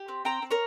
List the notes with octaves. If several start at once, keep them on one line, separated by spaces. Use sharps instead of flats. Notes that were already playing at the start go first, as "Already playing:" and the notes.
Already playing: G4
C4
C4 G5 A#5
C4
A#4 C#5